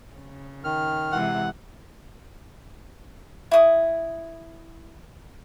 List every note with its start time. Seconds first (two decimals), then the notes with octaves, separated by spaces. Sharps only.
0.13 C#3
0.64 D#3 F6
1.12 C3 E3 G#3 F#5
3.51 E4 D#6